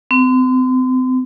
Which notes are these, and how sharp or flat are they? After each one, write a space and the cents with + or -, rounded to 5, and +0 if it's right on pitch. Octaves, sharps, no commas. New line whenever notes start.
C4 -35